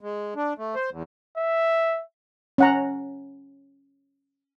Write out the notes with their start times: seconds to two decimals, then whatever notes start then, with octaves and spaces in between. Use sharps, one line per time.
0.01 G#3
0.36 D4
0.58 A3
0.75 C5
0.92 E2
1.37 E5
2.58 C#4 F#5 A#5